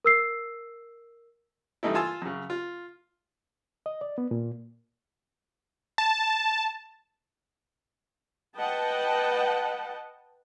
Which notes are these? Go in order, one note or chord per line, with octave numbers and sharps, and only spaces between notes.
A#4 E6 C7
G2 E3 A3 D#4 E4
F4 G#5 A5 C6 E6
F#2 C#3
F4
D#5
D5
B3
A#2
A5
B4 D#5 F#5 G5 A5